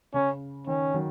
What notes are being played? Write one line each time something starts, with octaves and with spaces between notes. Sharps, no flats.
C#3 C#4
D#3 C#4
D#3 F#3